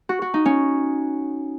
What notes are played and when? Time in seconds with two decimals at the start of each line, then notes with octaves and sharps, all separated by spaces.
0.09 F#4
0.22 F#4
0.34 D#4
0.46 C#4